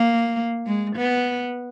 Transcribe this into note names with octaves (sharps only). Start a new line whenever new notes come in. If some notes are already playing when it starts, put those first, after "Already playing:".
Already playing: A#3
G#3
B3